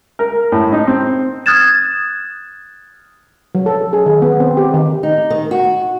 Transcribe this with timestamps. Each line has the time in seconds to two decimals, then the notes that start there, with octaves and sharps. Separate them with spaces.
0.19 A#4
0.52 A2
0.72 D#4
0.87 C4
1.46 D#6 F6 F#6 G#6 A6 E7
3.55 F#3
3.66 A4
3.93 G#4
4.06 D#3
4.22 B3
4.40 C4
4.57 G4
4.74 D#3
5.03 D#4
5.30 D#3
5.51 F#4